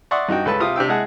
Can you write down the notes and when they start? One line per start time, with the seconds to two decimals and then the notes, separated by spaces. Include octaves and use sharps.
0.11 D5 E5 F#5 C6 C#6 D#6
0.28 G2 D#4 F#4 G5
0.46 C#2 A4 B4 A5
0.60 C3 F4 D#6
0.76 C3 D4 G5 E6
0.89 G#3 E4 G#4 F#5 A5